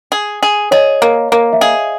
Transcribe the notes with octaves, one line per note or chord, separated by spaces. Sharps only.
G#4
G#4
G#4 C#5 D#5
A#3
A#3
E5
G#4 D#5 F5